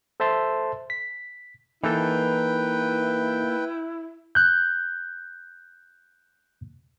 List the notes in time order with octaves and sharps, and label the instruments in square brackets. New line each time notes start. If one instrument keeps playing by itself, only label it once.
[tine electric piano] A4 C5 E5 A5 C6
B6
[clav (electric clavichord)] E3 A4 [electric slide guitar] A#3 D#4 [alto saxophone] E4 [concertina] B4 G5
[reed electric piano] F#6 G6